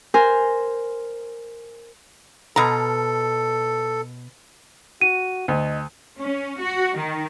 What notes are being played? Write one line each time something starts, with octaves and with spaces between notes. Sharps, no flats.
A#4 C5 G#5
B2 A4 A#5
F#4 D#7
D2 D#5
C#4
F#4
D#3